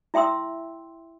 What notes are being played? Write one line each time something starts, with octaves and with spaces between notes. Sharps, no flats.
E4 E5 G5 C6 E6